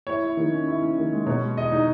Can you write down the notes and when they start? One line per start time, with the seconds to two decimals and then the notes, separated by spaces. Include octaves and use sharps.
0.07 E4 C#5
0.22 E4
0.37 D#3
0.52 C#4
0.67 E4
0.82 C#4
0.97 D#3
1.12 G#3
1.27 B2 C#5
1.42 G#3
1.57 E2 D#5
1.72 D#4